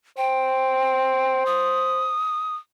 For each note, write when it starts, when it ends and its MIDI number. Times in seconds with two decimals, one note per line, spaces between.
0.17 2.14 72
0.17 1.44 79
1.46 2.55 87